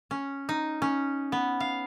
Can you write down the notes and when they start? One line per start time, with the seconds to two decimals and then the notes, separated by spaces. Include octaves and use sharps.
0.11 C#4
0.49 D#4
0.82 C#4
1.32 B3
1.60 F5